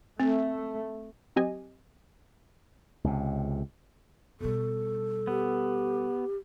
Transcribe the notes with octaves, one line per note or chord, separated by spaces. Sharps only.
A3 C4
F#3 C4 G4 D#5 G#5
C#2 C3
B2 G3 A4
B3 G4